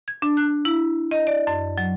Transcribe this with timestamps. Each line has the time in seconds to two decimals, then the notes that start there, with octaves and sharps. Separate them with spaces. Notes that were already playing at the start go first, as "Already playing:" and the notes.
0.08 G#6
0.22 D4
0.37 F#6
0.65 E4
1.11 D#5
1.27 D5
1.47 F#2
1.78 F#3